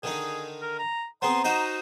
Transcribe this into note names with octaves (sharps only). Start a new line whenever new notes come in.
D3 D#3 D#4 G#4
A#4
A#5
B3 C4 G#4 A#5 C6
D#4 F#4 C5 D#5